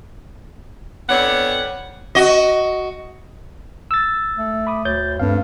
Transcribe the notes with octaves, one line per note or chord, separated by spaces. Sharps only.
F2 B3 C4 D4 C#5 F#5
F#4 D#5
E6 A6
A3
B5 D6 D#6
D2 C#5 G6 A6
G2 A3 C4 F5